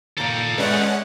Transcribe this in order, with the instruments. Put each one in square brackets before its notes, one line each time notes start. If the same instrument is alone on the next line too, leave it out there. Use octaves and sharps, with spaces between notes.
[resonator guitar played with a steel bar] A#2 D#3 [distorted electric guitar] A4 G5
[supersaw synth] G#3 C#4 F#5 [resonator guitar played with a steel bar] B4 D5 E5